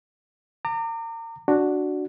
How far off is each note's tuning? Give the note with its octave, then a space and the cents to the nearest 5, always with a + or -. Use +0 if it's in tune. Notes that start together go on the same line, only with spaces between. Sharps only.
A#5 -35 D6 +25
D4 +0 F#4 +0